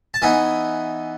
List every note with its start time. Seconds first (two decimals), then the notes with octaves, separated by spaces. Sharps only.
0.14 A5
0.22 E3 B3 D#4 G#5